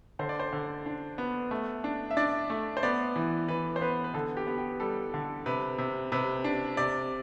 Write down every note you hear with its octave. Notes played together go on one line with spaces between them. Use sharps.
D3 C5
D5
C5
D3
D4
B3
A3
D4
E5
D4 D5
A3
C5
B3 D5
E3
E3 B4
C5
B3 B4
B4
D3 A4
G4
B3
G4
G3 A4
D3
C3 B4
C3
C3 B4
D4
C3 D5